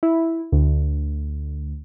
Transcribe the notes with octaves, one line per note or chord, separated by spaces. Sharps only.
E4
D2